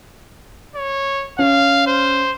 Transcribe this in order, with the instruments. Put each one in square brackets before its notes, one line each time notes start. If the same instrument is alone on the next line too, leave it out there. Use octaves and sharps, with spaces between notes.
[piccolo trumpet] C#5
[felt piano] C#4 [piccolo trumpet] F5
[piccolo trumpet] C5